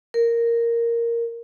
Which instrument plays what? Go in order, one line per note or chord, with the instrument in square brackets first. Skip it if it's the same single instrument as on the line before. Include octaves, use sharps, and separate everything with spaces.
[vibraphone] A#4